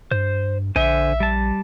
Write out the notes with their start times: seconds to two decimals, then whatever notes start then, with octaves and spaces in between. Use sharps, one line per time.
0.11 G2 C5
0.76 A#1 D3 C5 E5 G#5
1.20 G3 A5